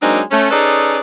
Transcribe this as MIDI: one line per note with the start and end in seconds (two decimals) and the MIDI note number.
0.02 0.21 54
0.02 0.21 56
0.02 0.21 58
0.02 0.21 60
0.02 0.21 62
0.02 0.21 63
0.31 0.47 57
0.31 0.47 61
0.51 1.01 61
0.51 1.01 63
0.51 1.01 68
0.51 1.01 69
0.51 1.01 71
0.51 1.01 74